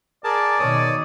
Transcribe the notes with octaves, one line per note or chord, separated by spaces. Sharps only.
G#4 A#4 D5 A5
B2 D#3 C#5 D#6